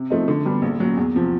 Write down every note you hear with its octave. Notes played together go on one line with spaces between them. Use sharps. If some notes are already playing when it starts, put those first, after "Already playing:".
Already playing: C3
F3 A3 C4 D#4
D3
G3 B3 D4
A#1
A#2 F#3
E2
C3 F3